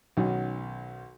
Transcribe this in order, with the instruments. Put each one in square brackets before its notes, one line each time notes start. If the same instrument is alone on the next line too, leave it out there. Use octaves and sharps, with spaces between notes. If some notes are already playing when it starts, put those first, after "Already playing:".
[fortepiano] B1 D#3 C#4 F#4